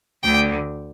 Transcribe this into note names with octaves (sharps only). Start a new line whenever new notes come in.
D2 D3 G5